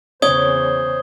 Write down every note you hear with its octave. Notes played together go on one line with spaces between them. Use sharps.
E2 C#3 C5 C#5 D#6 G#6 G7